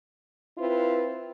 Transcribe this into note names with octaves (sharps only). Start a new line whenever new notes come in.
C4 E4 F4 B4